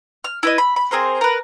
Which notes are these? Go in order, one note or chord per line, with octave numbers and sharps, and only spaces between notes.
F6
E4 B4 D#5
B5
B5
C4 G#4 A#4 C5
A#4 B4